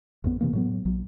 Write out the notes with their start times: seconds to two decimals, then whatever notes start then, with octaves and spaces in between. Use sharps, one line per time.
0.24 A1 F2 B3
0.41 C3 E3 A#3
0.53 A2 F#3 B3
0.85 A#1 F#3